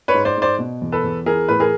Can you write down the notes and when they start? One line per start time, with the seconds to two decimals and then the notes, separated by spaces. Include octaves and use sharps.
0.08 B4 C#5
0.14 G#2
0.25 C5 D5
0.37 G#2
0.42 C5 D5
0.59 B2
0.81 E2
0.92 A4 B4
1.04 E2
1.26 E3 G#4 A#4
1.48 A2 B4
1.60 G#4 A#4